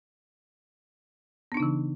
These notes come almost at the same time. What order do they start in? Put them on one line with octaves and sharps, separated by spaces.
B3 D4 D#4 C#3 E3